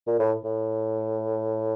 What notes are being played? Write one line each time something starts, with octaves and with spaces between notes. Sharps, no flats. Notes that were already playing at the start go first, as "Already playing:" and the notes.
A#2
A2
A2